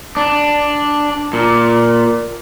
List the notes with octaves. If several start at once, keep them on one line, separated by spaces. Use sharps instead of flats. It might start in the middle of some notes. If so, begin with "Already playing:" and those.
D4
A#2